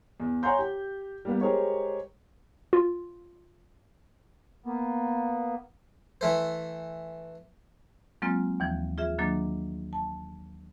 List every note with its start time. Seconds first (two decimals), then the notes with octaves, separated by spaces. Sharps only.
0.20 E2
0.43 C#5 F#5 G#5 A#5 C6 G6
0.59 G4
1.25 G3 A#3 B3
1.41 G#3 G4 G#4 A#4 C5 C#5
2.73 F4
4.66 A#3 B3
6.21 E3 A3 C5
8.22 F#3 G#3 A#3 C4 F4
8.60 D#2 E3 F3
8.98 F4 G#4 E5
9.18 D#3 F#3 A#3 D4
9.93 A5